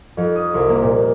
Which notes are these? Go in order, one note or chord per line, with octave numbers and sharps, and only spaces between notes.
F2
D#6
C2
A#3
A#2